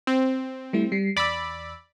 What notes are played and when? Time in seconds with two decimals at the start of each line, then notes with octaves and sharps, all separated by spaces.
0.07 C4
0.73 G3 A3 E4
0.92 G3 C7
1.17 E2 D5 B5 E6